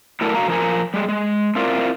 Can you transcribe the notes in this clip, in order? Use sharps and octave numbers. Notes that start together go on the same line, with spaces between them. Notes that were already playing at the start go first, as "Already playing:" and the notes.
F#3 A3 E4 A4 A#4 D5
D3 F#4 F5 A#5
F3 A#4 G#5
G3 G#3
G#3
C4 E4 F4 A#4 D5